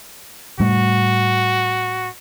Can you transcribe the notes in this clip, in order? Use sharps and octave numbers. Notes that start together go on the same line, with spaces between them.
A2 G3 A3 F#4